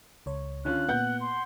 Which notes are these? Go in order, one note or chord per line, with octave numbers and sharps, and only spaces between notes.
C#2 C#5
D3 C#4 F4 F#6
A#2 B3 F#5 G6
C6